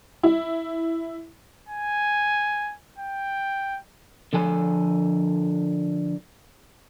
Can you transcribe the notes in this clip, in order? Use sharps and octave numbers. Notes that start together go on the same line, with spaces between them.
E4
G#5
G5
D3 F3 A4 G#5